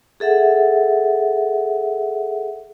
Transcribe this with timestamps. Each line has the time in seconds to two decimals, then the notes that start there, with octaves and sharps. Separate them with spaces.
0.20 G#4 A4 E5 F#5